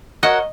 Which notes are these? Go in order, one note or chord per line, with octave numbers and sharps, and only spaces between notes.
F#4 A#4 C#5 D#5 F#5